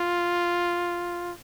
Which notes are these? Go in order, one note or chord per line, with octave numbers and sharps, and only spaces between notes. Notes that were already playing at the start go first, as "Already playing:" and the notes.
Already playing: F4